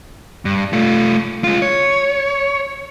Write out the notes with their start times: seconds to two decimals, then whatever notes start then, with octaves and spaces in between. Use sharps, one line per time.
0.45 G2
0.73 A3 F4
1.44 G#3 F4
1.62 C#5